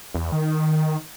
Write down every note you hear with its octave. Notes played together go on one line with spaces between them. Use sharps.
E2
D#3